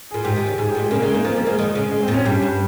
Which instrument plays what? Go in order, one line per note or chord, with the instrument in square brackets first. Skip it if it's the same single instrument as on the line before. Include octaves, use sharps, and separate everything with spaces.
[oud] A#2 [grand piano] G#4
[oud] G#2 [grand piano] G4
[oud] D#3
C#3
[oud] G#2 [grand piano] G#4
[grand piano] G4
[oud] A#2
[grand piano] G#3
[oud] C#3 [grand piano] A#3
[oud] C#3 [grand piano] G#3
[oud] D#3 [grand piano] A#3
[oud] F3 [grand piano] A#3
[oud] G3 [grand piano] A#3
[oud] F3 [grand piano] G#3
[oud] D#3
C#3
[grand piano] G#3
C4
[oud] A#2
[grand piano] C#4
[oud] G2 [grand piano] G4
[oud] G2